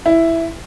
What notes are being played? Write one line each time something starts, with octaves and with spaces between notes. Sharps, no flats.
E4